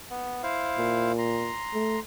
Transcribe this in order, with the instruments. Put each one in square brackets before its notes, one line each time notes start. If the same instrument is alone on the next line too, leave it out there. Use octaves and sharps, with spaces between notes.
[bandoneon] B3
E4 C5 F5
[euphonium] A#2
[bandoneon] A#5 C6
[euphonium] A3